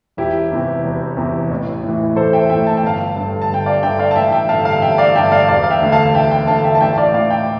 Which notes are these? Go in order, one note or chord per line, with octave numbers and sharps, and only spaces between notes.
E1 E4 G4
E2 C3 E3
E1
E2 C3 E3
A1
A2 E3
A1 A4 C5
E5 G5
A2 E3 E5 G5
A5
G5
G1 F5 A5
G2 D3
A5
G1 G5
D5 F5
G2 D3 E5 G5
D5 F5
A5
A1 E5 G5
E5 G5
G2 D3 F5 A5
F5 A5
A1 E5 G5
D5 F5
G2 D3 E5 G5
D5 F5
E1 D5 F5
F5
E5 G5
D2 D3
F5 A5
E1 E5 G5
E5 G5
D2 D3 F5 A5
E5 G5
A5
A1 E5 G5
D5 F5
A2 E3 D5 F5
E5 G5